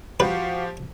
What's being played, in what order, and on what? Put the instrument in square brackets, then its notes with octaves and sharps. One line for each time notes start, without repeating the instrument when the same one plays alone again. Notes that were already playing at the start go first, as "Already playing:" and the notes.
[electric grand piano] F3 G4 C5 [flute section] F#4 F5 F#5 [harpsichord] B4